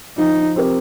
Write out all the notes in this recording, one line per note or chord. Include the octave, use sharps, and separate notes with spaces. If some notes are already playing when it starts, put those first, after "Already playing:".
F3 D#4
C4 G4 A#4